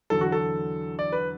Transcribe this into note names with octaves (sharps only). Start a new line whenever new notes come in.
E2 D3 F#3 A4
F#4
A4
D5
B4